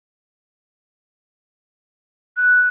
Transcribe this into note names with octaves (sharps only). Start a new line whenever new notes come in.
F#6